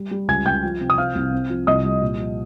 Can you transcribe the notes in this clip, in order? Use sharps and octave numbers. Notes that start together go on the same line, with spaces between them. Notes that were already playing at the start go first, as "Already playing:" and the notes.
Already playing: G3
G3
C#2 G#5 G#6
C#2 G5 G6
F3
C3
D#6
C4 F5 F6
C2
C4
F3
C2 D#5 D#6
G3
A#2
F3